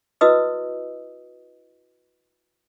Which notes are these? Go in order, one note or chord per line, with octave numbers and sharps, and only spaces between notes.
E4 F#4 B4 D#5 D#6 E6